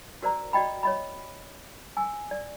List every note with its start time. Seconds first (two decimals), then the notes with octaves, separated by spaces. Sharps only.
0.23 F#4 A#4 C5 D5 A#5
0.53 F#4 D5 D#5 G5 B5
0.83 C#5 D#5 B5
1.97 G#5 E6
2.31 D5